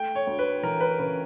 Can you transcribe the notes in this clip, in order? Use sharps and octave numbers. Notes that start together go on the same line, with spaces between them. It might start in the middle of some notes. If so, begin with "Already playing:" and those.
Already playing: A3 G5
C#5
D2
B4
E3 A#4
B4
C#3 B4